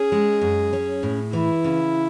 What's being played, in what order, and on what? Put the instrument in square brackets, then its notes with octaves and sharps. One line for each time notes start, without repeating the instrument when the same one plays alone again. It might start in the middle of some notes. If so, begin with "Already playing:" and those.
Already playing: [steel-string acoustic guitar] C#4 [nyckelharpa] G#4
[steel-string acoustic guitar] G#3
F#2
C#4
A2
[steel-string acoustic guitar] E3 [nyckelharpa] E4
[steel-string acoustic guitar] C#3